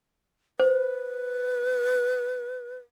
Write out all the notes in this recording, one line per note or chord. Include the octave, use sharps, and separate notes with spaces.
B4 C5